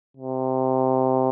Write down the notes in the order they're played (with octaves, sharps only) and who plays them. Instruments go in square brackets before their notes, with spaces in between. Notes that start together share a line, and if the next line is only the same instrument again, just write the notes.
[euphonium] C3